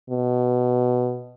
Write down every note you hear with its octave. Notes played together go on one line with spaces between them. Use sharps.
B2